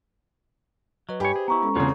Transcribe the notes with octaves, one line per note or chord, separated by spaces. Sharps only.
F#3 B4 D#5
G2 G4 C#5 G#5 B5
G#4 C5
B3 E4 A#5 C#6
G#3 C#4 A4
E1 C#3 B3 C4 F4 G#4 C#5